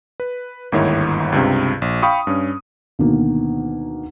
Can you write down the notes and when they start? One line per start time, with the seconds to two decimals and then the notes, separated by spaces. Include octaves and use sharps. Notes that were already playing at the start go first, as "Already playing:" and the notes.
0.20 B4
0.72 G1 D#2 G#2 D#3 E4 C#5
1.32 C#2 G2 C3
1.82 A#1
2.02 F5 G5 B5 C#6 D#6
2.27 G2 C#4
2.99 D2 B2 D#3 A#3